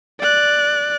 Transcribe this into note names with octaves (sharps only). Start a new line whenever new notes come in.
D5 F#6